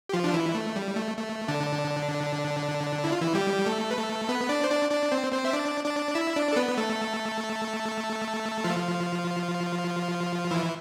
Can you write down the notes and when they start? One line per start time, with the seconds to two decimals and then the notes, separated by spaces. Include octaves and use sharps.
0.09 G4
0.13 F3 F4
0.24 D4
0.34 E3 E4
0.55 A3
0.76 G3
0.96 A3
1.17 A3
1.48 D3 D4
3.04 E4
3.12 F4
3.21 E3 E4
3.35 G3 G4
3.66 A3 A4
3.91 B4
3.97 A3 A4
4.29 B3 B4
4.49 D4 D5
4.64 C5
4.70 D4 D5
4.91 D4 D5
5.11 C4 C5
5.32 C4 C5
5.45 E5
5.53 D4 D5
5.84 D4 D5
6.15 E4 E5
6.36 D4 D5
6.53 A4
6.56 B3 B4
6.77 A3 A4
8.64 F3 F4
10.51 E3 E4